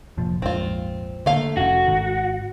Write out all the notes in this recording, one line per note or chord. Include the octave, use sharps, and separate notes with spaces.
F1 A#2 F3
A#1 F2 G#2 C4 F4
D3 A3 A#3 F5
F1 C#4 F#4
G#1 D#3